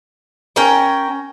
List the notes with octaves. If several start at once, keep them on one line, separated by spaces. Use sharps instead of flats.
C#4 A#4 G5